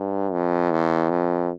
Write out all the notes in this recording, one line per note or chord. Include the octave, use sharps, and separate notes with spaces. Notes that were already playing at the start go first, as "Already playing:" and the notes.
Already playing: G2
F2
E2
F2